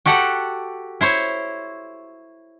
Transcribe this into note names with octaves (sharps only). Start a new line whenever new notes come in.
F#4 G4 A4 F#5
E4 C5 C#5